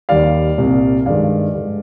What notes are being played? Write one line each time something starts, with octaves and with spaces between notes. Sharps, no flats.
D#2 D#3 G3 D5 F5
C2 A#2 G3
G2 D#3 G#3 D5 F5
G2 D3 G#3